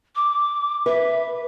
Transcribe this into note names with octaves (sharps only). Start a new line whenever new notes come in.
D6
B4 E5